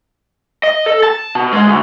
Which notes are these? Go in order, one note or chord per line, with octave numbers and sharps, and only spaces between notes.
D#5
A4
A5
B2
G#3
D2